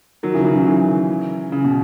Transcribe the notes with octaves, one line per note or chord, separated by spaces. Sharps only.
D#3 F#3
C#3 E3
C#3 E3
D#3 F#3
C#3 E3
C#3
B2